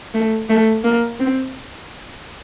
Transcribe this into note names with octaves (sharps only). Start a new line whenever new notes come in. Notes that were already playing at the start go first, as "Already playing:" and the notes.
A3
A3
A#3
C4